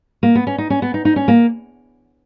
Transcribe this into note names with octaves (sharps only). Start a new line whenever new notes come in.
A#3
B3
C#4
D#4
C#4
B3
D#4
D#4
C#4
A#3